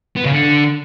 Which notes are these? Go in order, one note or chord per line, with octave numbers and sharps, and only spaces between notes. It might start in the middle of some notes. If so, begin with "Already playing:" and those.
B3
C#3
D3